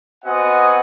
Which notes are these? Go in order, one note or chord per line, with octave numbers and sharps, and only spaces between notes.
B3 C4 F#4 D#5 F#5 G#5